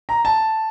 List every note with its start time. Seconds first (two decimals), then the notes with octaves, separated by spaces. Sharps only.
0.09 A#5
0.25 A5